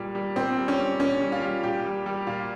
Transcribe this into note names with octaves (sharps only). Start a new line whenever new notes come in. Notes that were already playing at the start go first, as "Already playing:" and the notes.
Already playing: A#2 G3
G3
A#2 C4
G3
C#4
G3
A#2 C#4
G3
F4
G3
A#2 G4
G3
G3
A#2 F4